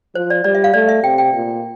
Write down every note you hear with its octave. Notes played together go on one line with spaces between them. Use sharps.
F3 C5
D5
G3 D5
E5
F5
A3 D5
E5
C3 G5
G5
A#2